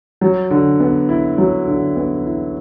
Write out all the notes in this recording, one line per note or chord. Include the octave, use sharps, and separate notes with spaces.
F#3
D3
B3
E4
F#3
D3
B3
E4